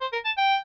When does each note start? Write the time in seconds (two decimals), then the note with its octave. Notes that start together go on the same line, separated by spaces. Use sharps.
0.01 C5
0.13 A#4
0.25 A5
0.37 G5